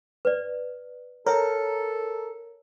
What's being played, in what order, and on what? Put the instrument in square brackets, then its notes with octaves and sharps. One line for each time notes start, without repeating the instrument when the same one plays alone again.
[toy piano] B4 D5
[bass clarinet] A4 [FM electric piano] A#4 [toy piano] C#5 E5